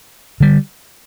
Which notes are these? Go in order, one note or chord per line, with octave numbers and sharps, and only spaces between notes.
D3 G3